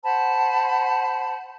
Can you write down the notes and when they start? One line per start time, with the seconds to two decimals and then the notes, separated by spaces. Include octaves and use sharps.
0.04 C5 F#5 A5 B5